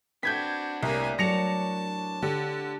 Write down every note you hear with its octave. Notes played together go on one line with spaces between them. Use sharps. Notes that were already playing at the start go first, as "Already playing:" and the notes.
C4 D4 F#4 B4 B5 G6 G#6 B6
C2 A2 A#3 D5 G#5
F#3 D4 A#4 C#5 A5 A#6 C#7 F7
D3 G4